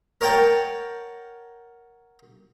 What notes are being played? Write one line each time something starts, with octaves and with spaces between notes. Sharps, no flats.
A#4 C#5 F#5 G5 A5